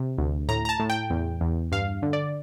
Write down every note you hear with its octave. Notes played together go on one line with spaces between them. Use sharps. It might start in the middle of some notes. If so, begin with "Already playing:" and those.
Already playing: C3
D2
A2 A#5
A#5
A5
A2
G5
E2
E2
G2 F5
D3
D5